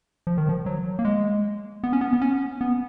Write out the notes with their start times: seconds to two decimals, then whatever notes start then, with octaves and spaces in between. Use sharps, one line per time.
0.27 F3
0.38 D#3
0.49 F3
0.66 F#3
0.99 A#3
1.05 G#3
1.84 B3
1.93 C#4
2.01 B3
2.13 B3
2.22 C#4
2.61 B3